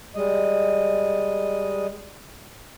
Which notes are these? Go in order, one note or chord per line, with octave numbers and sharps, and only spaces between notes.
G3 G#3 D#5